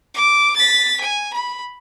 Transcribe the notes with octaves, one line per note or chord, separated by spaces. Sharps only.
D6
A6 B6
G#5
B5